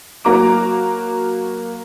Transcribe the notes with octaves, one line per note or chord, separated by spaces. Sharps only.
F#3 A#3 F#4 A#5 D6 D7